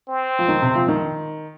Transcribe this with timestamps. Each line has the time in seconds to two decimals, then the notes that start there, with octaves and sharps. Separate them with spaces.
0.08 C4
0.39 F3
0.48 D#3
0.62 C3
0.75 F3
0.88 D#3